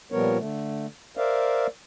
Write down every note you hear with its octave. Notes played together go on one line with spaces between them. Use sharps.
A#2 F3 G3 B3 A#4 C#5
D3 A3
A#4 C5 D5 E5 F5